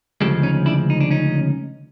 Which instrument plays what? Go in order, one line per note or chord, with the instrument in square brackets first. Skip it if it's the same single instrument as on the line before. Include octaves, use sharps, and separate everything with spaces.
[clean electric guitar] D2 C#3 F3 G#3 G4 A4
C#4 D#4
D4 E4
D#4
D4
C#4 D#4